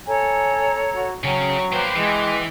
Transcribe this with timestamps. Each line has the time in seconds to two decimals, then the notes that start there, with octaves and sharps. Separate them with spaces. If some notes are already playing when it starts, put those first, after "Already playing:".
0.07 A4 C#5 G#5 A#5
0.95 F#4
1.24 C#3 F#3 C#4 G5
1.73 A#3 B4 C5 G5 D6
1.96 E3 G#3